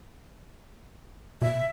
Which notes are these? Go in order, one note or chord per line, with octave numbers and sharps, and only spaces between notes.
B2 E5